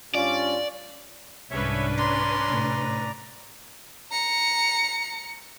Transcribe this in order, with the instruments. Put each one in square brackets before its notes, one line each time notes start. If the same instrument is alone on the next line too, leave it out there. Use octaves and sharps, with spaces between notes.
[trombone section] G2 C#4 F4 [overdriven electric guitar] D5
[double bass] C2 G#2 [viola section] C#4 D4 B4 [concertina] C#5 E5
[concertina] D5 A#5 [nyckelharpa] C6
[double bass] A2 C3
[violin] A#5 C#7